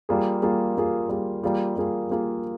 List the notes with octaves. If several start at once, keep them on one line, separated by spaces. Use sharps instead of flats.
G3 A#3 F4 G#4
G3 A#3 F4 G#4
G3 A#3 F4 G#4
G3 A#3 F4 G#4
G3 A#3 F4 G#4
G3 A#3 F4 G#4
G3 A#3 F4 G#4